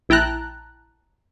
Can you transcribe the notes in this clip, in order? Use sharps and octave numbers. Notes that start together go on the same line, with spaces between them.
A#1 E4 G5 A5 A#5 F#6